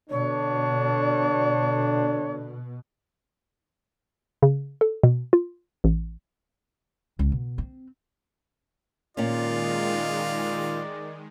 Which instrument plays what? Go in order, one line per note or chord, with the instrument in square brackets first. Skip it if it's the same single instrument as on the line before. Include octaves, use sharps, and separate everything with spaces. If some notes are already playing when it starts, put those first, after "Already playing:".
[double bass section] B2 [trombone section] D3 D4 [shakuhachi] C#5
[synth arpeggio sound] C#3
A4
B2
F4
A1
[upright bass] C#2
B2
C4
[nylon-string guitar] A#2 C#4 [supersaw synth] D#3 G#3 [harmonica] F4 [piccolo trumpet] D5